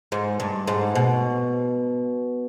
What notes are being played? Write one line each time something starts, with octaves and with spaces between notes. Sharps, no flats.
G#2
G2
G#2
B2